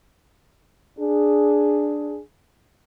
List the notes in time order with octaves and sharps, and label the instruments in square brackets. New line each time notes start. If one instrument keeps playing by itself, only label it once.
[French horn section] D4 G#4